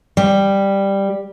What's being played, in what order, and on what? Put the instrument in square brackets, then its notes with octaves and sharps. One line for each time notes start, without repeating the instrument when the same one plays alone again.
[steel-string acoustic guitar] G3